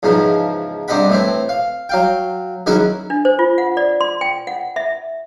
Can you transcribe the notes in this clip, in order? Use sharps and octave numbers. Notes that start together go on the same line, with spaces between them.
E2 G#2 C#3 F3
G2 C3 C4 D#5 F#5 B5
A2 E3 C4
F5
F#3 F5 G5
D#3 F#3 C#4 E4 F#4 G#4
D4
C5
F4
F#5
D5
C6
G5
F#5
E5